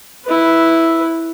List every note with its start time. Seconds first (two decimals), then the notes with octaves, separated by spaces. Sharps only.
0.25 E4 B4